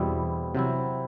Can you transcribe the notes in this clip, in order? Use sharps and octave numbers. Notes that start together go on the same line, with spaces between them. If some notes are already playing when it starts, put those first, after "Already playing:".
Already playing: E2 B2 G3 C4 E4
C3 F#3 C4 E4